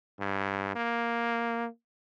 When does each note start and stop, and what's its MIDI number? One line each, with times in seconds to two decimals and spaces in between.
0.20 0.73 43
0.75 1.67 58